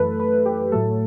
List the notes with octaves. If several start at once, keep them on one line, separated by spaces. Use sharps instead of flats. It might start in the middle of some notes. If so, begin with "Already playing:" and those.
Already playing: F#2 E3 A3 A4 B4
B4
G4
A2 F#3 A3 A4